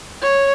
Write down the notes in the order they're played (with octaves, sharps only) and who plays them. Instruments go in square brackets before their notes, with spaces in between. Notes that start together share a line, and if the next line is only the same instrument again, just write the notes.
[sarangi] C#5